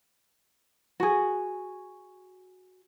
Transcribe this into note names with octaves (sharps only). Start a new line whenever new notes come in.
F#4 G#4